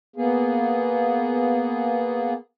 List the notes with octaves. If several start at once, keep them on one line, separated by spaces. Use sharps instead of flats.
A#3 B3 G#4